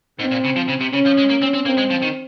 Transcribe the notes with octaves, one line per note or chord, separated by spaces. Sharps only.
G#2 C4
A#2
C#3
F3
C#3
C3
C#3 C#4
F3
G#3
A#3
C4
C4
A#3 C4
G#3
F3
D#3